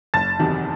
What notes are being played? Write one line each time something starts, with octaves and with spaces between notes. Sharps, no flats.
F#1 A5 A6
E2 C3 D#3 F#3